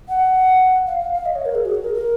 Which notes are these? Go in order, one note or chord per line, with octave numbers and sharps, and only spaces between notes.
F#5
F5
F5
F5
D#5
C#5
A#4
G#4
F#4
G#4
A#4
A#4